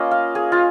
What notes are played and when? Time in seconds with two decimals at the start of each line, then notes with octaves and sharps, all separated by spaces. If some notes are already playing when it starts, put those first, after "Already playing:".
Already playing: A#3 C#4 F4 D#5
0.11 F5
0.35 G#4
0.52 F4